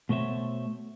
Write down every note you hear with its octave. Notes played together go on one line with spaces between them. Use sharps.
B2 A3 C5 C#5 E5